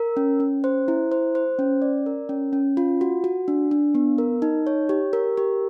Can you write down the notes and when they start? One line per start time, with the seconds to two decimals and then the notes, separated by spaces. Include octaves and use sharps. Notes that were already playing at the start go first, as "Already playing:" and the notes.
Already playing: A#4
0.17 C#4
0.40 C#4
0.64 C5
0.88 E4
1.12 C5
1.35 C5
1.59 C#4
1.82 D5
2.06 A#4
2.29 C#4
2.53 C#4
2.77 F4
3.01 F#4
3.24 F#4
3.48 D4
3.71 D4
3.95 B3
4.18 A#4
4.42 D#4
4.67 C#5
4.89 G4
5.13 A#4
5.37 G4